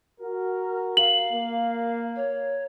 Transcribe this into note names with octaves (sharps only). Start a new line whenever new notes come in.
F#4 A#4
F5 F#7
A#3
C#5